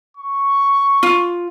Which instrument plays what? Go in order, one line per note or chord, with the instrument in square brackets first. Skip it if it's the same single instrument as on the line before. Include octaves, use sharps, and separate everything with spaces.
[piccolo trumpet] C#6
[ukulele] F4